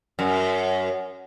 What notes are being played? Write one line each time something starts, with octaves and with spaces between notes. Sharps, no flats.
F#2